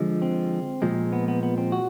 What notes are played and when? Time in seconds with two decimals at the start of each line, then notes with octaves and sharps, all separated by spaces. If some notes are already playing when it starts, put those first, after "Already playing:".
Already playing: D3 F3 G#3
0.22 C4
0.82 A#2 F3 G#3
1.12 B3
1.28 B3
1.43 B3
1.58 C4
1.72 F#4